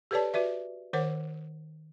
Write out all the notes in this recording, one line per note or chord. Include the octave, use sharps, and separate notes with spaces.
G4 A4 B4 C#5 D5 A5
F#4 B4 D5 E5
D#3 A#4 C5 C#5 F#5